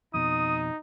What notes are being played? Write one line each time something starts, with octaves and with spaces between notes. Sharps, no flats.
F2 B2 D#4 D#6